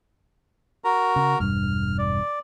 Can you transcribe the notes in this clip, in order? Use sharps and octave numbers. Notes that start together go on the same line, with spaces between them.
F#4 A#4 A#5
C#3
E1 G2 F6
D5